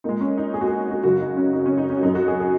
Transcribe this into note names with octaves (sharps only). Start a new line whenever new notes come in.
A#2 G#3 D#4
C#4
D#4
G#4
F#4
G#4
F#4
F#2 C#3 F#3 F#4
D#4
C#4
D#4
C#4
D#4
C#4
F#4
F#2 F#3 D#4
F#4
G#4
G#4